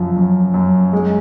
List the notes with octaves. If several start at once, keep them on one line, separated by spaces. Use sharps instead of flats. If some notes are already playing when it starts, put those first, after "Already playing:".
Already playing: F#2 F3
F#2
F#2
G#3